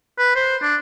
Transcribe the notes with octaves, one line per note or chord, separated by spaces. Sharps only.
B4
C5
D4